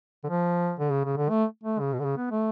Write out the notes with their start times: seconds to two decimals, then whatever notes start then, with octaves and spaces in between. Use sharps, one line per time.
0.24 D3
0.29 F3
0.79 D3
0.91 C#3
1.05 C#3
1.17 D3
1.29 A3
1.64 A3
1.80 C#3
1.93 B2
2.00 D3
2.05 C#3
2.17 B3
2.31 A3